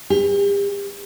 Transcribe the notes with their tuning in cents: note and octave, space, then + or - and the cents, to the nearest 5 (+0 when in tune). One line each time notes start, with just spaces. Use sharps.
G4 +35 B4 +0